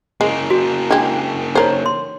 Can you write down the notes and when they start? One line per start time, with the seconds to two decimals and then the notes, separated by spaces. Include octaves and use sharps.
0.21 C#3 G#3 A#3
0.50 F#4
0.91 G#3 D4 G4
1.55 D#4 A#4 C5 C#5
1.86 C6